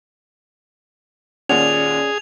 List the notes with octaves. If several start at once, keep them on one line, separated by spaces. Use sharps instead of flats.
D#2 A#2 C#4 G#4 D5 F#5 F7